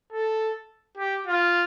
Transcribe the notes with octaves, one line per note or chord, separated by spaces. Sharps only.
A4
G4
F4